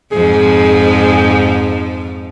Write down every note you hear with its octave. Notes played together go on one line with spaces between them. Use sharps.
F2 G#2 F3 G#4